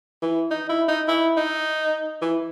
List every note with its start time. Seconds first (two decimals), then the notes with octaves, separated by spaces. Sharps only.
0.22 E3
0.51 D#4
0.69 E4
0.88 D#4
1.08 E4
1.37 D#4
2.22 E3